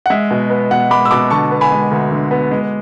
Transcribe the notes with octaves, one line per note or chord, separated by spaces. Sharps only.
F#5
G#3 E5
B2
B3
B2 F#5
G#3 B5 D6
E6
B2 B5 D6
D3 A5 C#6
B3
G#5 B5
G#3
D2
D3
B3
G#3